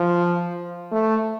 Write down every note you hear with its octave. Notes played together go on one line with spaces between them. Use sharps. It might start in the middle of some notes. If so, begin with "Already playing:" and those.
Already playing: F3
A3